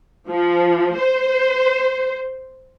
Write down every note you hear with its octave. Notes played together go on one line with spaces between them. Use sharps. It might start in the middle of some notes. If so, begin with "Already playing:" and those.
F3
C5